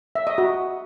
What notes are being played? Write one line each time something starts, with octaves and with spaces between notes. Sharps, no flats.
E5
D#5
F#4